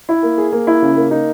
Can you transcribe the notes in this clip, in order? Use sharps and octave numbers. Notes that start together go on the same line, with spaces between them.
E4
A#3
G#4
A#3
E4
C#3
A#3
D#4